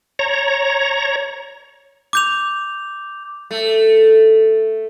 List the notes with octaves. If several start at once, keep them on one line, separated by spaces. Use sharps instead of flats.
C#5 A#5
D6 G6 F7
A3